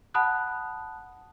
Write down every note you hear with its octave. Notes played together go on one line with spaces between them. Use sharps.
F#5 A5 B5 D#6 F#6